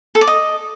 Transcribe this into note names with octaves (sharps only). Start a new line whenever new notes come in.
A4
D5
D#5